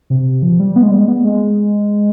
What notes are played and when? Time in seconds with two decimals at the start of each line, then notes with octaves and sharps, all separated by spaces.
0.10 C3
0.42 F3
0.60 G3
0.76 B3
0.83 G#3
0.91 G3
0.98 G#3
1.08 B3
1.25 G#3